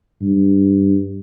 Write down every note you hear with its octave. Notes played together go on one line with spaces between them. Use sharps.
G2